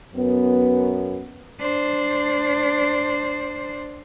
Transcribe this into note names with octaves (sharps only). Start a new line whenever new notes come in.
F#2 B3
D4 C5